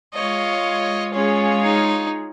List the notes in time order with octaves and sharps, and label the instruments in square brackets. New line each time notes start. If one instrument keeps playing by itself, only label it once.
[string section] G#3 F4 C#5 [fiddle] D#5
[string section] G#3 F4 G#4 C#5 [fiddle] C#4
[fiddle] D#4